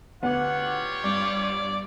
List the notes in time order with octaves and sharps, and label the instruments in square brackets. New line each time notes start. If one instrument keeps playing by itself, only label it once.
[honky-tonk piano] D2 D6 [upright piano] B3 [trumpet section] F4 G4 C#5 [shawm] F#5
[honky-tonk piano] G2 [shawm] D5